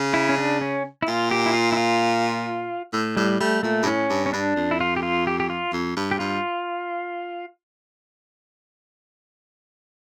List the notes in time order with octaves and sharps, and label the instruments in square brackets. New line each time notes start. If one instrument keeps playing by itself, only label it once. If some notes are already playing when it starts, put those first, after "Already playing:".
Already playing: [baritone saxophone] C#3
[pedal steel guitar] E4
C#4
D4
C#4
E4
[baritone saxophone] A#2 [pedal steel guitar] F4
[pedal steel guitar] G4
E4
F4
E4
F4
[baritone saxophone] A2
[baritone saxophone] A2 [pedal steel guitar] G3
[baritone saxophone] G3 [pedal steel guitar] A3
[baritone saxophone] A#2 [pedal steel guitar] A3
[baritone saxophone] G2
[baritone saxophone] A2 [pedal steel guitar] C#4
[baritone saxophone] G2
[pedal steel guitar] C#4
[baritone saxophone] G2 [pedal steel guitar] D4
[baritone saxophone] F2
[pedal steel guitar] E4
F4
G4
F4
G4
G4
F4
[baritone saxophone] F2
G2
[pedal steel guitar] G4
[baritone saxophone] G2 [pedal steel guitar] F4